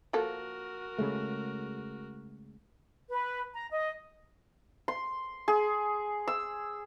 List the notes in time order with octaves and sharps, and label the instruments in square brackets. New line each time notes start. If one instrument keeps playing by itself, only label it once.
[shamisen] F3 A#3 A4 [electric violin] F#4 A#4
[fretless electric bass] C#3 G#3 A3
[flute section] B4
A#5
D#5
[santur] C6
G#4
E6